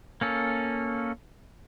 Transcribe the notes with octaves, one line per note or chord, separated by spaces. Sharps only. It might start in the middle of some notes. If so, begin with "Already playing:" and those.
A#3 C#4 A4